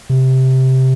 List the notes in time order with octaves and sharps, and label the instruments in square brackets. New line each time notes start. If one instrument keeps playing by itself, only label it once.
[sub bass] C3